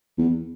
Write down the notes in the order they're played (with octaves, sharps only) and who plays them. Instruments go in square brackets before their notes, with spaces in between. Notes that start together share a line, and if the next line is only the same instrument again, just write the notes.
[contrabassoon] E2